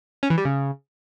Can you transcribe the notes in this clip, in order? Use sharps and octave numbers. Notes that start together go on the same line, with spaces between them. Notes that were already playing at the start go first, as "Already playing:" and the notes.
C#4
E3
G3
C#3